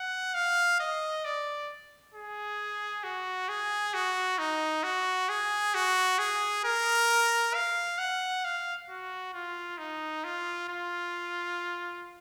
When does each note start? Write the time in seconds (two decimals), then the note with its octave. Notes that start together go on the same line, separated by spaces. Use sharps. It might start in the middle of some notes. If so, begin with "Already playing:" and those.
Already playing: F#5
0.34 F5
0.80 D#5
1.25 D5
2.14 G#4
3.03 F#4
3.49 G#4
3.94 F#4
4.38 D#4
4.83 F#4
5.29 G#4
5.75 F#4
6.18 G#4
6.65 A#4
7.54 F5
7.98 F#5
8.44 F5
8.89 F#4
9.34 F4
9.78 D#4
10.24 F4
10.69 F4